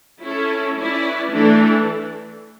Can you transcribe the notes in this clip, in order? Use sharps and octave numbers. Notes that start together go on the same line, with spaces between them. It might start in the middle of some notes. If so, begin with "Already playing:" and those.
C#4 E4 A4
C#4 E4 B4 D5
E3 A3 D4 A4